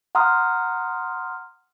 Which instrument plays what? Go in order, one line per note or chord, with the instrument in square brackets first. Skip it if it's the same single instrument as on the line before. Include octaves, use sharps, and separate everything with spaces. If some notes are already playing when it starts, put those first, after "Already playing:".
[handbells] F#5 A#5 C6 D#6 F6